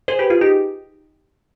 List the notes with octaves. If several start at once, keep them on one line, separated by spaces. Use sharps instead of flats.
G#4 C5
G4 B4
F4 G#4
D#4 G4